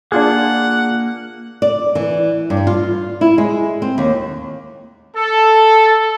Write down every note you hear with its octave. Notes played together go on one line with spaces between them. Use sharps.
A#3 D4 F4 G#4 F#5
D5
E3
G2
F4
E4
G#3
C4
D#2
A4